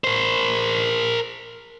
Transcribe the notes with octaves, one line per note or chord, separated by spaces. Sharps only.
A#4 C5